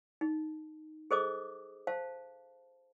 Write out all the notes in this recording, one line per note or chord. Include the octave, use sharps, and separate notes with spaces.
D#4
G#4 A4 C5 D#5 D6 D#6
C5 F5 A5